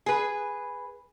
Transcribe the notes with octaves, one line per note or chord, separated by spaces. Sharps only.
G#4 B4